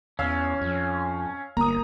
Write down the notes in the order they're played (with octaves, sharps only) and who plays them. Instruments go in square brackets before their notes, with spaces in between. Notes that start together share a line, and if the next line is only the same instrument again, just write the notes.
[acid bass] E2 [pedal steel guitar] C#4 [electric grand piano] F5 E6
[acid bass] F2
[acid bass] G1 [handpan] A#3 [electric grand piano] A#5 D#6